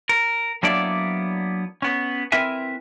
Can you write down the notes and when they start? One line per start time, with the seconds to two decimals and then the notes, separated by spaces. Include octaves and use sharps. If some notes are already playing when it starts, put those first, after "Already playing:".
0.09 A#4
0.63 F#3 A#3 B3 D4 E4 D5
1.82 B3 C#4
2.32 C4 E4 A#4 B4 E5 G#5